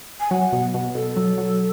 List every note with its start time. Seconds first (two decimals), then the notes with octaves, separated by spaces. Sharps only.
0.20 G#5
0.31 F#3 F#5
0.52 B2
0.74 B2
0.95 B2 A4
1.16 F#3
1.38 F#3